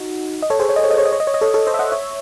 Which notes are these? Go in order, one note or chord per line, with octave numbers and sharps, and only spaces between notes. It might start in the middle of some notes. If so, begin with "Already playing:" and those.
Already playing: D#4 F#4
D#5
A4 C#5
G#4 C5
C#5
D#5
C#5
D#5
C#5
D#5
C#5
D#5
C#5
D#5
A4 C#5
A4 C#5
C5 D#5
E5
D#5 F#5
C#5 E5